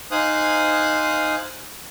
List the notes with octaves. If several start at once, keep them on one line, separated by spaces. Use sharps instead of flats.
D#4 C5 F5 G#5 D#6 F#6